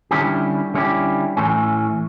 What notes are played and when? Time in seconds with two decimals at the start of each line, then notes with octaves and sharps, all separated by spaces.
0.11 D3 G3 C#4 E4 G4
0.74 D3 G3 C#4 E4 G4
1.37 A2 E3 A3 C#4